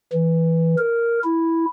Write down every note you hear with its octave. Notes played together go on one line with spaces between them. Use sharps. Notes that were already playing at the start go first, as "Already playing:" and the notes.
E3
A#4
E4